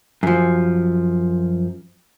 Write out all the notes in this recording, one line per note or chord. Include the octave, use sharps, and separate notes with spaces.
F#2 F3